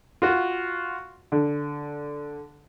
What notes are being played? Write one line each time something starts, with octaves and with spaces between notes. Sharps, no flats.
F4 F#4
D3